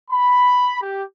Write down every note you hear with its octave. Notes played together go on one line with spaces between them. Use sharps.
B5
G4